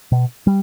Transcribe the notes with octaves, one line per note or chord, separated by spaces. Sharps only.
B2
G3